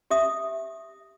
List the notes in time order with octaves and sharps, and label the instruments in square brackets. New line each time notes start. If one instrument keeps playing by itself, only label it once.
[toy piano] G4 E5 D#6